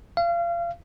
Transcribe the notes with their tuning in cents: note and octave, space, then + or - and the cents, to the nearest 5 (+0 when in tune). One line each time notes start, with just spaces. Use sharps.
F5 -30